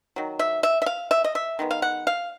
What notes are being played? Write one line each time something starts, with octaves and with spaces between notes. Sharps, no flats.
D#3 F#3
E5
E5
E5
F5
E5
D#5
E5
D#3 G#3 B3
F5
F#5
F5